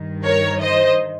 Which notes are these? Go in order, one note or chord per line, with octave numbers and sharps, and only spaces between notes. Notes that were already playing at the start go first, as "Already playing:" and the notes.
Already playing: G2 D#3
A#4 C#5
C5 D#5